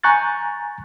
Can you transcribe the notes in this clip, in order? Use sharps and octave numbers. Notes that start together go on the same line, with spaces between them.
G#5 A#5 C#6 F#6 G6 A6